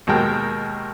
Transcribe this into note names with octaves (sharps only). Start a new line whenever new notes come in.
D#2 B2 G#3 A#4 G5 A5